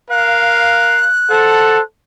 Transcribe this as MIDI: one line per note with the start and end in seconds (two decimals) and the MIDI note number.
0.10 1.08 70
0.10 1.08 77
0.10 1.82 90
1.30 1.80 69
1.30 1.80 72
1.30 1.80 78
1.30 1.80 81